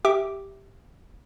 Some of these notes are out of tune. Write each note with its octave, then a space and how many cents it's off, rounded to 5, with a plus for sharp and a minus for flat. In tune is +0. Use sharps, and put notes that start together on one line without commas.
G4 +0 E5 +0 D6 +0